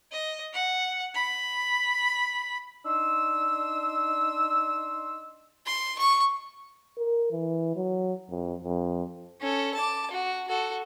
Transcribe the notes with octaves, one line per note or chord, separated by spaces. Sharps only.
D#5
F#5
B5
D4 D#4 C6 E6
C6
C#6
A#4
E3
F#3
F2
F2
C#4 A4
A5 D6
F#4
F#4 A4